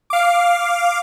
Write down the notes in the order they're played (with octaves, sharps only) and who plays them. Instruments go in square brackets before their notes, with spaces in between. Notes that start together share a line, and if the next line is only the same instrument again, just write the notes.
[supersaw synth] F5 D6